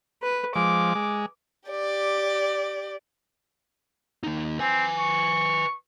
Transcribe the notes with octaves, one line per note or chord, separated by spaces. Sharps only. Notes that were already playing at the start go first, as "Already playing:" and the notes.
B4
F3 G#3 D6
G#3
G4 D5
D#2 D#4
C4 B4 G#5
C#6